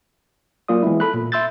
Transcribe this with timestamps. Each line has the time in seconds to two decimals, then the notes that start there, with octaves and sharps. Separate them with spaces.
0.68 F#3 A#3 F4 D5 D#6
0.83 E3 G#3 B3 E4
1.00 A4 B5 F#6
1.14 A#2
1.32 E5 C6 E6 G6 A6